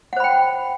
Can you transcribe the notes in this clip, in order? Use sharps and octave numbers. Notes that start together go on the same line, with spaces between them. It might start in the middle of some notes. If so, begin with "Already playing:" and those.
C5 F#5 G5 B5